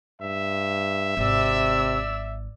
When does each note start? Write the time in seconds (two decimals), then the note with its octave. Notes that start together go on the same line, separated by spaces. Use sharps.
0.22 G2 E5
1.17 G#1 C3 D5 E6